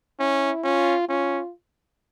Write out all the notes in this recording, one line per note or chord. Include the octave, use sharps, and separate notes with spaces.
C#4 E4
C#4 F4
C#4 F4